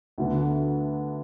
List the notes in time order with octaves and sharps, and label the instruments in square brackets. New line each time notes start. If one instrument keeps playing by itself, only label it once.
[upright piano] D2 D3 B3